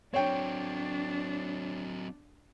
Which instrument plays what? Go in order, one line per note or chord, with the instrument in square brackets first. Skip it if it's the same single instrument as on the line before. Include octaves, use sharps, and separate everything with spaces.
[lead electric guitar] F#3 C4 [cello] D4 [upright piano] C#5 G5